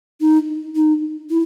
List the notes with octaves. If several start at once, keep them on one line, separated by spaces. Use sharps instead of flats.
D#4
D#4
E4